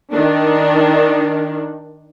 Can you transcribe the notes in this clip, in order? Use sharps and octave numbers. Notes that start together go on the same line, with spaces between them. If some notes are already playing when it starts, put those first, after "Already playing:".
D#3 D4